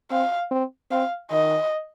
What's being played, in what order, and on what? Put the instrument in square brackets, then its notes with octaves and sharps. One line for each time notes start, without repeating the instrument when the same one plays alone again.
[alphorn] C4 [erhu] F5
[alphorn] C4
[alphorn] C4 [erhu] F5
[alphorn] D#3 [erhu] D#5